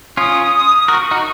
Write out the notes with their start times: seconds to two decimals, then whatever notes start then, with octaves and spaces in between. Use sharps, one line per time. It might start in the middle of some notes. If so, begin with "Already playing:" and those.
0.17 C#4 F4 D#6
0.88 F#4 A#4 C#6
1.11 D#4 F#4